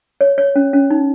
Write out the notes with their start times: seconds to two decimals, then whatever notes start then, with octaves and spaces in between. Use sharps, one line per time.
0.21 C#5
0.38 C#5
0.56 C#4
0.73 C#4
0.90 D#4